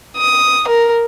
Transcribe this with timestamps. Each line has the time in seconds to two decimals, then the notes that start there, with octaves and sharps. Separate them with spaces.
0.17 D#6
0.68 A#4